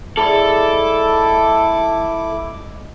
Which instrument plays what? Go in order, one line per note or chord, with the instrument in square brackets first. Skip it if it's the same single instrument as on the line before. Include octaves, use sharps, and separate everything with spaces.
[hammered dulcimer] G#2 G#4 D5 [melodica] E4 D6 [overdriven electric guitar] A4